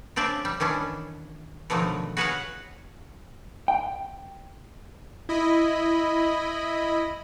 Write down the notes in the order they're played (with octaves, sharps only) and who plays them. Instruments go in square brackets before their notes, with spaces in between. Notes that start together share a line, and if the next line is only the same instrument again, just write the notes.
[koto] C#3 C4 D4 D5 E5
G3
D#3 E3 C#4 D4
B2 D3 D#3 F3 F#3 A3
F#4 G#4 B4 C#5 F5 F#5
[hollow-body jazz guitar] G5
[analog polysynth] E4 D#5 B5